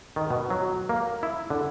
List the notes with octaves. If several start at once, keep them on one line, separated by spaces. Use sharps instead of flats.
D#3
B2
F#3
A#3
E4
D3